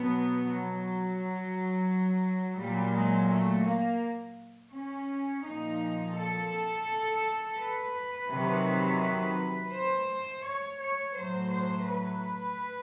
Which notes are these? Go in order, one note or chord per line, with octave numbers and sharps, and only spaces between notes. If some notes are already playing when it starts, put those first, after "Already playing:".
Already playing: B2 F#3 B3
F#3
A#2 F#3 G3
G#3
A3
A#3
C#4
A#2 F3 D#4
A4
B4
C3 D#3 F#3
C5
C#5
C#5
A2 F#3 C5
C5
B4